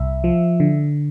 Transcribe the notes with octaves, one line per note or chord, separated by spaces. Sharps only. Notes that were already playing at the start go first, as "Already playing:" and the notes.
Already playing: C2 E5
F3
D3